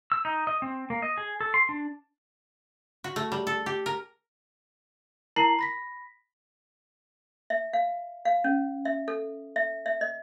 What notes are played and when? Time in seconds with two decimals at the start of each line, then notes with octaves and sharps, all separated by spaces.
0.12 E6
0.25 D#4
0.47 D#5
0.62 C4
0.90 A#3
1.02 D#5
1.18 G#4
1.41 A4
1.54 C6
1.69 D4
3.04 F#4
3.16 A3
3.32 G3
3.47 A4
3.66 G4
3.86 A#4
5.36 E4 A#4 A5 A#5 C7 F#7
5.59 B5 A#6 B6
7.50 E5
7.73 F5
8.25 F5
8.44 C#4
8.85 E5
9.08 A4
9.56 E5
9.86 E5
10.01 D#5